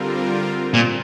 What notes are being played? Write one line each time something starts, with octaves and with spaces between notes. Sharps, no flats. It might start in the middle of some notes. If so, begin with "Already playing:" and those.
Already playing: D3 G3 C4 F4 A#4
A#2